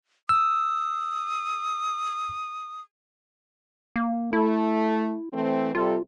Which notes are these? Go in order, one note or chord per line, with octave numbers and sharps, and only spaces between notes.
D#6 E6
A#3
A3 E4
E3 A3 C4
C3 G3 F4 A4